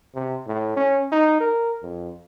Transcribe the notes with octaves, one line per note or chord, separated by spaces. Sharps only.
C3
A2
C#4
D#4
A#4
F2